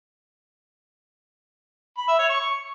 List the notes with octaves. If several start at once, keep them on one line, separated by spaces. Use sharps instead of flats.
B5
E5
C#5
C#6